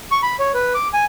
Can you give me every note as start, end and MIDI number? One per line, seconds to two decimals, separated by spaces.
0.11 0.21 85
0.23 0.36 83
0.39 0.52 73
0.54 0.73 71
0.74 0.88 86
0.93 1.05 80